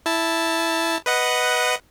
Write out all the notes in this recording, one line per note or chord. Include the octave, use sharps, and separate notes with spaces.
E4 A5
B4 D#5 F#5